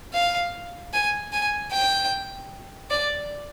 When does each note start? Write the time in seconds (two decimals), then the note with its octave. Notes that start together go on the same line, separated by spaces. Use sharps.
0.14 F5
0.93 G#5
1.33 G#5
1.72 G5
2.90 D5